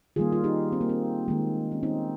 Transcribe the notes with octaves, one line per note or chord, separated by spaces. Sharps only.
D#3 G3 A#3 F4 G#4
F4
D#4 G4
C4
A#3
C4
D#3 G#3 A#3
C#4
C4 D#4